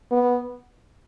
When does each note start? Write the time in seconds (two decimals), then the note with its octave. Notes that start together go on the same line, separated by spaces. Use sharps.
0.12 B3